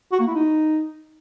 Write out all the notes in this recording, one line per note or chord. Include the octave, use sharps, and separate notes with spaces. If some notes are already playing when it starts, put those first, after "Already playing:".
F#4
A#3
E4
D#4